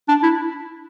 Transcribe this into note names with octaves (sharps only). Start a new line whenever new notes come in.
D4
E4